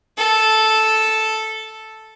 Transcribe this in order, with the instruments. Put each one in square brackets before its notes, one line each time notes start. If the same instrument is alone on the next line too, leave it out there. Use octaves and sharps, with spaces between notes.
[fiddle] A4